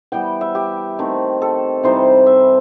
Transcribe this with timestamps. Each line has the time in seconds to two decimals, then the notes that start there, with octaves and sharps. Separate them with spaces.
0.12 E3 G3 B3 G5
0.41 E5
0.55 G4
0.99 D#3 A3 C4
1.42 A4
1.83 C3 E3 G3 D#4 C5
2.26 E5